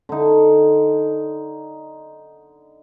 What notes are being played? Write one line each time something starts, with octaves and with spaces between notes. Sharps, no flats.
D3 D#4